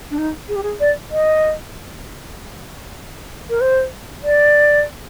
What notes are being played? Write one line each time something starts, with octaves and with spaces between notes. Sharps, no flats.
D4
D#4
G#4
G4
G#4
D5
D#5
A#4
C5
D5